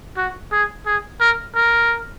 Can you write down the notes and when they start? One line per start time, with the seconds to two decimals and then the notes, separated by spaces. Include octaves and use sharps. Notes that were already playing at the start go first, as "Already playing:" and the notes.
0.17 F#4
0.52 G#4
0.86 G#4
1.21 A#4
1.56 A#4